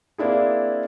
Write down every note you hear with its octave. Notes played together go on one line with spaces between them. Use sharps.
A#3 C4 D4 E4 G#4